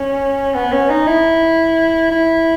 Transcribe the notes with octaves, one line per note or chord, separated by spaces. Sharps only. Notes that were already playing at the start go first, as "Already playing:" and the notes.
Already playing: C#4
B3
C#4
D#4
E4
E4